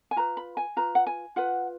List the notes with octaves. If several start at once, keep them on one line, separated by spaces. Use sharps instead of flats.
G#5
F4 B4 A#5
B5
G#5
F4 B4 A#5
F#5
G#5
F4 B4 F#5